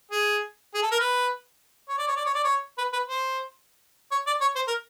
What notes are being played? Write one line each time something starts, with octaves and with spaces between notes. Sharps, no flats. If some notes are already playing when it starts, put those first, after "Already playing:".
G#4
G#4
A4
A#4
B4
C#5
D5
C#5
D5
C#5
D5
C#5
B4
B4
C5
C#5
D5
C#5
C5
A#4